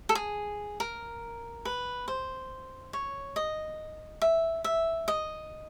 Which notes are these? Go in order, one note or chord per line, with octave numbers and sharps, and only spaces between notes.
A4
G#4
A#4
B4
C5
C#5
D#5
E5
E5
D#5